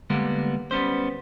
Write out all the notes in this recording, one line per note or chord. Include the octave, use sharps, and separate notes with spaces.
D3 G3 G#3 A#3 B3
G3 B3 C#4 C5